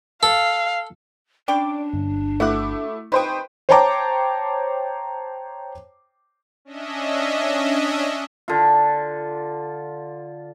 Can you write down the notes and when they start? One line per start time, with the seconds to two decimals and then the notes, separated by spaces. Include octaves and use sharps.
0.23 A4 F5
1.48 C#4 D4 D5 G5 B5 D6
1.94 G1
2.40 A3 E4 F#4 F#5 D6
3.12 C3 D#4 B4 C5 G5 C#6 D#6
3.69 C5 C#5 G5 A5 A#5 D6
6.65 C#4 D4 D#5 E5
8.48 D3 F4